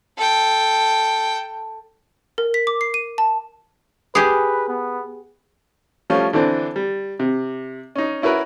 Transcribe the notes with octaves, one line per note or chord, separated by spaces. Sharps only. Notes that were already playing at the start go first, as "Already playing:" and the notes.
A4 G5
A#4
B6
D6
C7
D#7
A5
G4 G#4 B4
B3
F3 G3 A3 C#4 F4
D3 E3 C4 D4
G3
C3
C#4 D#4
C#4 E4 F#4 A#4 B4